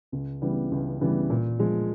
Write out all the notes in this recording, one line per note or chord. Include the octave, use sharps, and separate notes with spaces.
C#2
C#3 E3 G3 B3
C#2
C#3 E3 G3 B3
A#2
F3 G#3